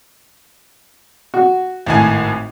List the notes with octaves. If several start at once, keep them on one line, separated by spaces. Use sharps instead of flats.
F#4
G#1 A2 G#5